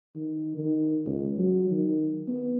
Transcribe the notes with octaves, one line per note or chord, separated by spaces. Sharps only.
D#3
D#3
C#2
F#3
D#3
B3